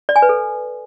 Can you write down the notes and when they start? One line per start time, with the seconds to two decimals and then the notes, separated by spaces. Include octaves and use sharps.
0.09 D5
0.16 G#5
0.22 B4
0.29 A4